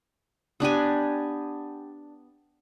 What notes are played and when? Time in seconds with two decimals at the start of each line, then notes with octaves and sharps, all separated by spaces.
0.60 B3 D4 G4 G#5